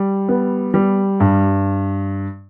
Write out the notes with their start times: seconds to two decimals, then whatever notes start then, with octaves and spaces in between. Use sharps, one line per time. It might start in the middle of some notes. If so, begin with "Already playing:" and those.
Already playing: G3
0.29 B3
0.74 G3
1.20 G2